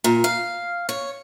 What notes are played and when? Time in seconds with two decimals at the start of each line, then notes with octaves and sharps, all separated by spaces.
0.04 A#2
0.24 F5
0.89 C#5